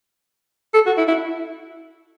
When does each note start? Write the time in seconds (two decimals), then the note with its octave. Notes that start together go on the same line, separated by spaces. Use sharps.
0.74 A4
0.86 F#4
0.97 E4
1.08 E4